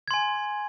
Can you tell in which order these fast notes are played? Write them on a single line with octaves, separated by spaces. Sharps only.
G#6 C6 G#5